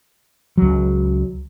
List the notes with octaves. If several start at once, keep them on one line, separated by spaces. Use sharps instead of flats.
C#2 F#3